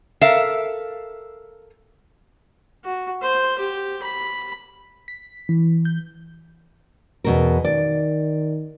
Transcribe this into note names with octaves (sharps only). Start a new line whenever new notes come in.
A4 A#4 E5 F5
F#4
C5
G4
B5
B6
E3
G6
E2 B2 A#4
D#3 D5